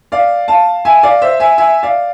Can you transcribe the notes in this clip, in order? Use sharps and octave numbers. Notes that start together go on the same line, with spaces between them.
D5 F5
F5 A5
E5 G#5
D5 F5
C5 E5
E5 G#5
E5 G#5
D5 F5